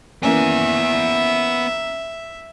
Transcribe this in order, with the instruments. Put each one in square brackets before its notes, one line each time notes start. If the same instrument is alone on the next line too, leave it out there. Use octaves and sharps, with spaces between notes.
[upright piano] E3 A#3 C#4 [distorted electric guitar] B3 G#5 [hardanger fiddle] E5